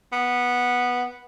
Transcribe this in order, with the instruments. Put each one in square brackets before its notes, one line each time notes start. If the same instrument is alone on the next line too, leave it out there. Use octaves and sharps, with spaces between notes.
[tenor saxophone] B3